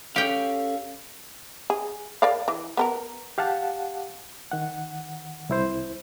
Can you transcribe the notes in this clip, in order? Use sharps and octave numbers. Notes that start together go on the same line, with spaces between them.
C#4 G4 A4 C#5 F5 G5
G#4
A#4 D5 F5
E3
B3 A4 A#4
G4 F5 F#5 A5
D#3 F#5
C2 E4 C5